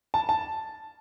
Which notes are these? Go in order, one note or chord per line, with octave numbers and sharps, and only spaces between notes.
A5
A5